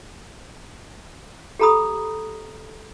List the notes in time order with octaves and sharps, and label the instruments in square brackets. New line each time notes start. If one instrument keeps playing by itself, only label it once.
[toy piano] G4 A4 A#5 B5 D#6